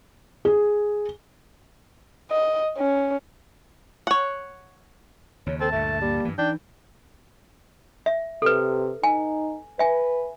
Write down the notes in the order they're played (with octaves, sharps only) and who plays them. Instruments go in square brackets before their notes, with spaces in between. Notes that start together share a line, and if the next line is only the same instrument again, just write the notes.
[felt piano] G#4
[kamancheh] D#5
C#4
[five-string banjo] C#5 F#5
[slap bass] D#2 C#3 [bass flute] C#5
[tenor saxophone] C4 [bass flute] A4 [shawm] A5
[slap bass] D2 G2 A#2 [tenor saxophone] A3 [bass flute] E5
[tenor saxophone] G3 [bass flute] A#3
[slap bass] G2 E3
[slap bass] E3 [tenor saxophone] D4 [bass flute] D#4 [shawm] G5
[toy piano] E5
[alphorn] C3 [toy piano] A4 B4
[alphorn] D#4 [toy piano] G#5
[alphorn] B4 [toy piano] E5 G#5